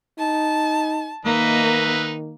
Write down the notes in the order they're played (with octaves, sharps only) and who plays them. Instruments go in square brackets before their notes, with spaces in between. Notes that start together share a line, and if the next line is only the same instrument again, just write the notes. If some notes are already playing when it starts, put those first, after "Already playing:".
[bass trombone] D#4 [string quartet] A5
[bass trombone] D#3 [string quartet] A#3 [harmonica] D#4 B4 E5